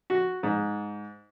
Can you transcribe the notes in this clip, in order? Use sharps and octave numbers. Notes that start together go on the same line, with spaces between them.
F#4
G#2